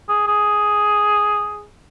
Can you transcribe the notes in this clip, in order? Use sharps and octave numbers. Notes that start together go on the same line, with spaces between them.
G#4
G#4